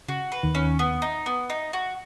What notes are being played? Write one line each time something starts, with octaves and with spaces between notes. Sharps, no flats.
C#3 F#4
B4
D#2 D#3
C#4
B3
D#4
B3
D#4
F#4